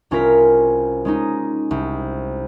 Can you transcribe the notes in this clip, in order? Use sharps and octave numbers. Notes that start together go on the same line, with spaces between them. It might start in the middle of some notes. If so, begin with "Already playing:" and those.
C2 C#4 F4 A#4 B6
G#3 C#4 D#4
C2